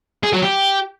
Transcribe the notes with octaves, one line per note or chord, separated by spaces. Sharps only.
G#4
F#3
G4